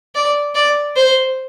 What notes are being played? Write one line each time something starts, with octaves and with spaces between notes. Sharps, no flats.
D5
D5
C5